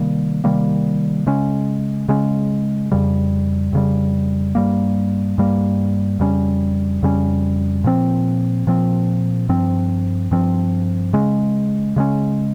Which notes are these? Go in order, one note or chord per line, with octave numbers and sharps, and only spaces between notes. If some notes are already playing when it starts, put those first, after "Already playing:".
Already playing: C3 D#3 G3 A#3
C3 D#3 G3 A#3
C#3 G#3 C#4
C#3 G#3 C#4
F2 C#3 G3
F2 C#3 G3
G2 G3 A#3
G2 G3 A#3
F2 C#3 G3 C#4
F2 C#3 G3 C#4
A#2 F3 C4
A#2 F3 C4
G2 F3 C4
G2 F3 C4
C#3 G#3 C#4
C#3 G#3 C#4